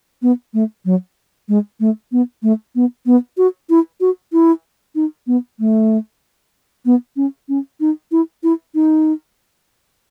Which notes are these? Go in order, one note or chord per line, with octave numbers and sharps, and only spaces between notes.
B3
A3
F#3
G#3
A3
B3
A3
B3
B3
F#4
E4
F#4
E4
D#4
B3
A3
B3
C#4
C#4
D#4
E4
E4
D#4